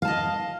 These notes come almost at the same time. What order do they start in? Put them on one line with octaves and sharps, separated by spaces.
F5 A5 D#5